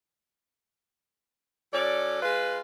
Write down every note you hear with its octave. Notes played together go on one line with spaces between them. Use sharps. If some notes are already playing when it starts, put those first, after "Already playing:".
F#3 C#4 A4 D5
G#3 F4 B4